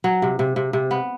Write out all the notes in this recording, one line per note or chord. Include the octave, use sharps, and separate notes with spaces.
F#3
C3
C3
C3
C3
B3